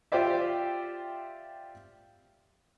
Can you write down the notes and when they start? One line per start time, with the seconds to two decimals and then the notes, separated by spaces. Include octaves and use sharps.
0.12 F4 G4 C5 D5 E5